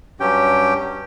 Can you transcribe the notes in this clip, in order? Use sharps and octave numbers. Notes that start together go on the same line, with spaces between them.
G2 F#3 C#4 G4 G5